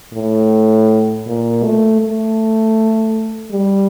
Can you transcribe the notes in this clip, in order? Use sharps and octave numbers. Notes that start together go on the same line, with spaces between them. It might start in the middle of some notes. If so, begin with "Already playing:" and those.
A2
A#2
A3
A3
G3